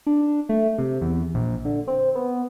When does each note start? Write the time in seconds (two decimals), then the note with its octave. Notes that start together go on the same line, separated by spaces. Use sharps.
0.06 D4
0.49 A3
0.78 C3
1.01 E2
1.35 A#1
1.65 D3
1.88 C4
2.15 B3